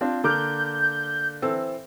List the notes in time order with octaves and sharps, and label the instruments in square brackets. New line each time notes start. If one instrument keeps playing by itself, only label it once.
[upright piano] C4 D4 F4
[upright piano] D3 D6 F6 [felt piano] A#3 [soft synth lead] G6
[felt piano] E3 C4 A4